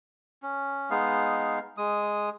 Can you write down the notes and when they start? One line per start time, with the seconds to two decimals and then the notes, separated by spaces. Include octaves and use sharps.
0.43 C#4
0.90 G#3 B3 D#4 F5
1.77 G#3 D#6